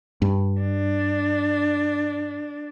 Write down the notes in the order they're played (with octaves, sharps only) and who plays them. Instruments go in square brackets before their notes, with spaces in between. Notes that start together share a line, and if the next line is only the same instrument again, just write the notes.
[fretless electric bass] G2
[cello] D4